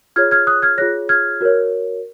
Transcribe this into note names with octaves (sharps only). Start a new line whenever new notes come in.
F4 G#4 C#5 F6 G#6
F6 G#6
D#6 F#6
F6 G#6
F4 G#4 C#5 F#6 A#6
F6 G#6
F#4 A#4 C#5